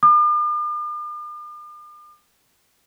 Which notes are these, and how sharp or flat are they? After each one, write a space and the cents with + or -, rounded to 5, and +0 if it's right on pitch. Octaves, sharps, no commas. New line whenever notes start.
D6 +45